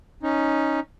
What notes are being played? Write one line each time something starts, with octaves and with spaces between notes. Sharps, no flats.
C#4 D#4